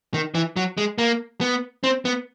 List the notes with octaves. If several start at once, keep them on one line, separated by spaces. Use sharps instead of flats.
D#3
E3
F#3
G#3
A#3
B3
C4
B3